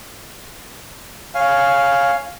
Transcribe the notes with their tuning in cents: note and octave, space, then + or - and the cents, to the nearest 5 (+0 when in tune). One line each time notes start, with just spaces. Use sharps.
C#5 +0 F5 +0 G#5 +0